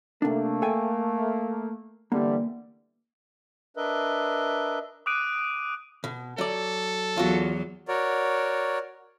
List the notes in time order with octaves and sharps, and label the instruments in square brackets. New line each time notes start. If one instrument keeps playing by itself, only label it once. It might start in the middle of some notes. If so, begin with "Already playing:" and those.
[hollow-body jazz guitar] C3 D4 [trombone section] A3 A#3
[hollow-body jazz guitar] A4 G5 G#5
[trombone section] D3 E3 G3 [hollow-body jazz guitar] A#3
[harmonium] D4 A#4 B4 D#5 E5
[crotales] D6 D#6 F#6 D7 D#7
[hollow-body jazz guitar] B2
[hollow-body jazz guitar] F#3 D5 [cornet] A4
[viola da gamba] E2 F#3 [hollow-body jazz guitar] F4 F#4
[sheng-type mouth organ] F#4 A#4 C#5 D5